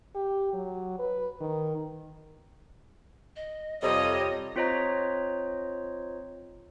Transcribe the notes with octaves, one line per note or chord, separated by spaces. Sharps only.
G4
F#3
B4
D#3
D#5
F2 C3 G3 C#5 D#5
C4 F4 C5 C#5 D#5 A#5